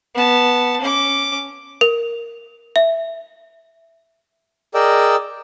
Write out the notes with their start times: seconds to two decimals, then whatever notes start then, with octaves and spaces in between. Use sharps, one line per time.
0.15 B3 A5
0.81 C#4 D6
1.81 A#4
2.76 E5
4.74 G#4 A#4 D5 D#5 G5 E6